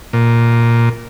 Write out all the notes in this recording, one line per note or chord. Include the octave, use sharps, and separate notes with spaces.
A#2